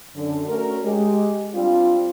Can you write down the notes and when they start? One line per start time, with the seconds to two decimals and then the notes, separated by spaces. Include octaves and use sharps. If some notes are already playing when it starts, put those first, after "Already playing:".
0.15 F#2 D3 D4
0.48 A3 C#4 F#4 A#4
0.84 G#3 G4
1.54 G3 C4 D4 F4